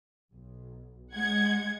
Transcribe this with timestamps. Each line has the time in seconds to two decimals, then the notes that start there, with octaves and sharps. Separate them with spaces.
0.34 B1
1.14 G#3 F#5 G#6